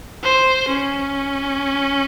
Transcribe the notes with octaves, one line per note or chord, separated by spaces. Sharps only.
C5
C#4